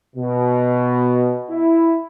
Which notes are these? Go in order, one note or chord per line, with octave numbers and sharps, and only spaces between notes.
B2
E4